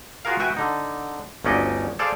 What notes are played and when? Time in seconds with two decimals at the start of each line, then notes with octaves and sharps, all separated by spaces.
0.25 F4 F#4 G#4 A#4 F5
0.40 F#4 B4 E5 G5 G#5
0.57 D3 D#4
1.45 G1 D2 C#4 D#4 D5 D#5
1.99 G#4 A4 C5 D5 F5